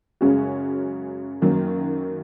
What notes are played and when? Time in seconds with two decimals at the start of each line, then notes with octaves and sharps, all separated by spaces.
0.21 F#2 C#3 G#3 C#4 F#4
1.42 F#2 D#3 F#3 A#3